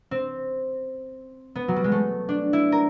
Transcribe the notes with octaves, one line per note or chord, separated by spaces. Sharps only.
C4
B3
F#3
G3
G#3
A3
D4
E4
A#4